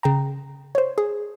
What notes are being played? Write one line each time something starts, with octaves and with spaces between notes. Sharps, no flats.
C#3 G5 A#5
C5 C#5
G#4